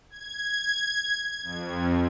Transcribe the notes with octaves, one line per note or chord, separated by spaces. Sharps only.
G#6
F2